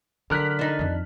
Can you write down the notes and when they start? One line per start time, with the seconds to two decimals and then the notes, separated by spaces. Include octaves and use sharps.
0.30 D3 F#3 A#4 F6 F#6 B6
0.59 D4 D#4
0.79 F2 D#3